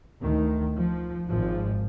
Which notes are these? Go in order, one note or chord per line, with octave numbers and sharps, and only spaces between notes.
D2 D#3
F3
G#1 G#2 F3